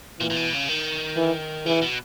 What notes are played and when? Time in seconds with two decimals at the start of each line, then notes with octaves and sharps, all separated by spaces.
0.20 A#2 E3
0.30 A#2
0.36 B2
0.53 C#3
0.68 D#3
1.16 E3
1.66 C#3 E3
1.81 B2